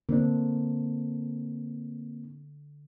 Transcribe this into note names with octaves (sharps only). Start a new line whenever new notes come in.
D3 A#3 C4 D4